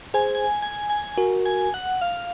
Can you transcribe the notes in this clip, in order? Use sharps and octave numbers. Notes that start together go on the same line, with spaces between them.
G#4 C5 G#5
G#5
G#5
G#5
F#4 A#4
G#5
F#5
F5